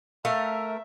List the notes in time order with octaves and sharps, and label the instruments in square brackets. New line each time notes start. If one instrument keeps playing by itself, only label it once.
[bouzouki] A3 A#4 F5 [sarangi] E5